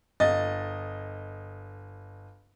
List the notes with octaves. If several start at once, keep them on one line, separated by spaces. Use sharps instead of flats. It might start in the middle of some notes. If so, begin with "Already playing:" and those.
G1 D#5 A6